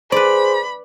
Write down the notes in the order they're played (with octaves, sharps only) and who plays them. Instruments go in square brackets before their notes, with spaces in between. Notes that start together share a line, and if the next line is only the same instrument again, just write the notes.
[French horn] G#4 [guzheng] B4 D5 [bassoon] C5 [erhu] B5